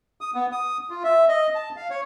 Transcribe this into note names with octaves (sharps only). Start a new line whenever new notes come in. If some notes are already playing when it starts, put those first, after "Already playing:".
D#6
B3
D#6
F4
E5
D#5
A5
F5
C#5